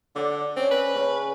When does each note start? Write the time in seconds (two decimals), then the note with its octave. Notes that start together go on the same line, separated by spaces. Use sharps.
0.16 D3 D5 F#5
0.56 C4 C#4
0.71 B4
0.94 C#3 C#4 B5